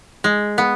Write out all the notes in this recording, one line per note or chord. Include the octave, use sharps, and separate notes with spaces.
G#3
B3